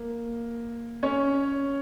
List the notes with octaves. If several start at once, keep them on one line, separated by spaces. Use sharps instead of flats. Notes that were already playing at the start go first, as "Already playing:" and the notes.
Already playing: A#3
C#4 C#5